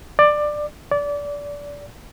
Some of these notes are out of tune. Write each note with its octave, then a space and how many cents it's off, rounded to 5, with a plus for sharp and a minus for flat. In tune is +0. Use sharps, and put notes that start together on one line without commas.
D5 +15
D5 -25